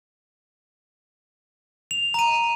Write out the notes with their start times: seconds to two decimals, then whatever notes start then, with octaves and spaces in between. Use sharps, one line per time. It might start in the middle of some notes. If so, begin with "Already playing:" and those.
1.91 F7
2.14 A#5 D#7